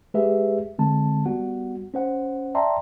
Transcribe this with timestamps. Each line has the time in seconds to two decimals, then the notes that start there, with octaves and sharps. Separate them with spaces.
0.14 G#3 G4 G#4 B4 E5
0.79 D3 G#3 C4 A5
1.26 G3 B3 F#4 F#5
1.94 C#4 C5 F#5
2.55 D5 E5 G5 A5 A#5 C6